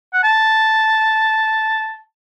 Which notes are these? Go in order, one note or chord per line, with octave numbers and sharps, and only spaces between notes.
F#5
A5